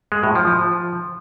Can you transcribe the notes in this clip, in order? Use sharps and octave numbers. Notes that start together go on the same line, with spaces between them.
G#3
A2
F3
F3